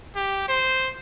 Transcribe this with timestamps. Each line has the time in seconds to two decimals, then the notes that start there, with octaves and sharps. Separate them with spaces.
0.16 G4
0.48 C5